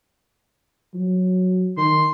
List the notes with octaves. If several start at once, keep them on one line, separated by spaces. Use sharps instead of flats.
F#3
D#3 C6